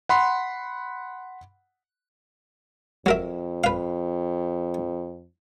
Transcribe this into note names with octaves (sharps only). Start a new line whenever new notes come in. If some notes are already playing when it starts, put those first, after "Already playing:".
F#5 B5 C6
F2 F#3 A#4 E5
B4 F5